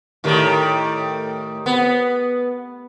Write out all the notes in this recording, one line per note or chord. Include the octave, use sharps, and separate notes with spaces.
A2 D#3 G3
B3